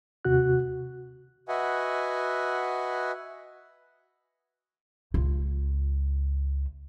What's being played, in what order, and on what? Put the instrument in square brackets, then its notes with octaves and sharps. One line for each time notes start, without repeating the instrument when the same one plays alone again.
[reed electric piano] D#2 C3 F#4 F#6
[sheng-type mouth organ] F#4 B4 D#5 E5 F#5 G#5
[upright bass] C#2 F4